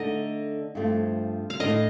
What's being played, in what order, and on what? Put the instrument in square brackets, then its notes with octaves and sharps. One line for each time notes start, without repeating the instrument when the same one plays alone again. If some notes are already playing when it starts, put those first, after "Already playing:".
Already playing: [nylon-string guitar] D3 A3 D#4 [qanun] D#5
[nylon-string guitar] G2 F3 A3 C4
[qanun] F5
[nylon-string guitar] A2 A3 D4 [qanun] D#5